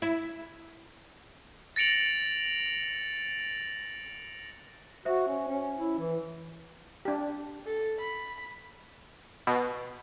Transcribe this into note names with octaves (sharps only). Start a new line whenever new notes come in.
E4
A6 A#6 C#7 D7 F7 F#7
F#4 C5 E5
C#4
C#4
E4
E3
D4 G4
A4
B5
B2